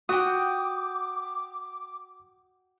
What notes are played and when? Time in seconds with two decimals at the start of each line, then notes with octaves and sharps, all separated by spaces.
0.09 F#4 F#5 G5 D6 D#6